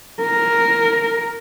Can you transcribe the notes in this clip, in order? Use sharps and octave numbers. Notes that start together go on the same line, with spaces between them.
A#4